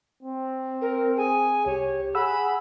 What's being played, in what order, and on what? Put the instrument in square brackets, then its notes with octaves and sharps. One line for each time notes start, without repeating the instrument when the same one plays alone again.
[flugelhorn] C4
[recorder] A#4
[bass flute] G#4 [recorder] G#5
[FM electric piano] C2 [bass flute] G4 [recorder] C#5
[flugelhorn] G#4 [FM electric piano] F#5 E6 [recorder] B5